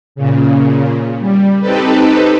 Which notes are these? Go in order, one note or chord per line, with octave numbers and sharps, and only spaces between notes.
A#2 C#3
G3
C4 D#4 G4 A4 B4